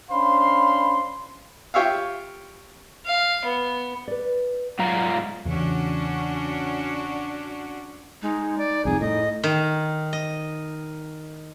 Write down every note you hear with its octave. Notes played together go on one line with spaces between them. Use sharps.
C#4 D4 C5 F5 B5 C6
F4 G4 C#5 E5 F5
F5
B3
B4 D5
G#2 F#3 F4 A#5
E2 C#3 E3 C#4 D4 F#4
G#3 D#4
D5
C2 F2 A2 G#4
A2 D#5
D#3
D#5